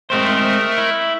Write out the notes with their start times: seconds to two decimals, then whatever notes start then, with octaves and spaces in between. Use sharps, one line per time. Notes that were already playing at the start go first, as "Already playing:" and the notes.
0.10 G#3 A3 C4 A#4 C5
0.78 E4